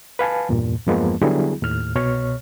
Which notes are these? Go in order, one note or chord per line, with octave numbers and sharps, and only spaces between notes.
B4 F5 G#5 A5
E2 G2 A#2
E2 G2 F3 G#3 A#3 B3
D3 F#3 G3 B3 E4 G#4
D#2 A2 F6
C2 B2 C#5 F6